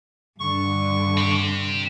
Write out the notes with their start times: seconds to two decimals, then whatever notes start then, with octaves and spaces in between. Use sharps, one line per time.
0.40 G2 D3 C#6
1.18 C4 G4